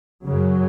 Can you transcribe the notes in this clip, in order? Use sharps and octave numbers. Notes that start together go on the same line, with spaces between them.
F#2 C#3 F#3